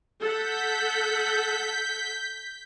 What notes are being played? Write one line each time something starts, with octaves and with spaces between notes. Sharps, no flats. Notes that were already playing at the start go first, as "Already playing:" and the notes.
A4 F#5 G6 B6